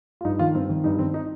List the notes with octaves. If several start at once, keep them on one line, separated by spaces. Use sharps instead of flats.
F4
G2 D#4
D#3 F4
G2 C4
D#3
G2 D#4
D#3 C4
D#4